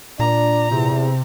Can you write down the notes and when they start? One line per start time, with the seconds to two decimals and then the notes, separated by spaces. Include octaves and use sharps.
0.20 A#2 D4 D5 A#5
0.71 E2 C3